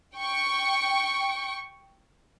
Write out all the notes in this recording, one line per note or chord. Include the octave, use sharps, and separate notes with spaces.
G5 C#6